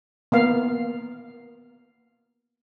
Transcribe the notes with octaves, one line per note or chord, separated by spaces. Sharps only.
A#3 B3 F5